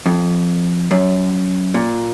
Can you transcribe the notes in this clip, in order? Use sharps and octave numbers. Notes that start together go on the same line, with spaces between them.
F2
F#2
A#2